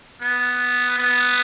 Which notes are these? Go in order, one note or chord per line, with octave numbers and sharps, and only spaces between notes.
B3
B3